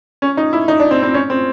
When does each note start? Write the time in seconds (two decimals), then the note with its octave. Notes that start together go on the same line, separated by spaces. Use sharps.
0.22 C#4
0.37 D#4
0.53 E4
0.68 D#4
0.80 D4
0.91 C4
1.03 C4
1.14 C#4
1.30 C4